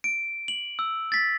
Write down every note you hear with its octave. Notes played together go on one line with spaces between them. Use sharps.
D7
F#7
E6
A6 B6